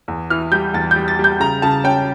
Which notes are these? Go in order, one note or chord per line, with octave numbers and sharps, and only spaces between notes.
E2
E3 F6
G3 G6
E2 A6
G3 G6
A6
G3
G6
C#3 A#5
C#3 A5
C#4 G5